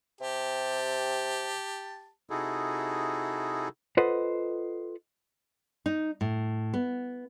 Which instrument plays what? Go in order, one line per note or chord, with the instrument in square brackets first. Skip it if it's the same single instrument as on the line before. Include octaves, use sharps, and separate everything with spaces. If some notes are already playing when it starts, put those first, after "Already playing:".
[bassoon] C3 [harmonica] G4 A5
[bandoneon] C3 D#4 E4 F#4 G#4 A4
[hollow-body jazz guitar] F4 A4 B4 C5 D#5 F#5
[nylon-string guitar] D#4
A2
B3